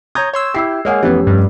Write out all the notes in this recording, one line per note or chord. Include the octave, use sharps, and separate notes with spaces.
C#5 A#5 D#6 G6 G#6
C#5 C6 E6
E4 G4 E6 C7
G#3 A#3 G#4 C#5 F#5 G#5
F1 E3 B3 C#4 G4
G2 G3